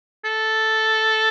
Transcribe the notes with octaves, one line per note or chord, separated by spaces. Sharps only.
A4